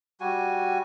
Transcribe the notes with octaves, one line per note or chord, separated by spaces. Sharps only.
G3 F#4 G#5